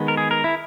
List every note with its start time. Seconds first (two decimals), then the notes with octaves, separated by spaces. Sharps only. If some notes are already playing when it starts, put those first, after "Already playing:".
Already playing: D#3 G#3 B3
0.08 A#4
0.17 G#4
0.31 A#4
0.44 E4